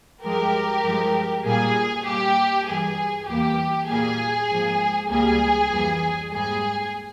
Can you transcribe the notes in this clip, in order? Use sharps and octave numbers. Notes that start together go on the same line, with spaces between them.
G2 F3 G#3 G4 A#4
G2 F3 G#3
A#2 G3 A#3 G#4
G2 G3 A#3 G4
G2 E3 G3 G#4
E2 E3 G3 A#3 G4
A#2 G3 A#3 G#4
G#2 F3 A#3
C#2 C3 G3 A#3 G#4
F2 E3 G3 A#3
G#2 G3 A#3 G#4